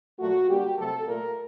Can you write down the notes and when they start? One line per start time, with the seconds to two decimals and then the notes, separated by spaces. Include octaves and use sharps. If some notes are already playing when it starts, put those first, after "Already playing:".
0.19 A#2 F#3 A3 F#4
0.48 D3 G3 A#3 G4
0.77 C3 F#3 A3 A4
1.07 A#2 A3 A#4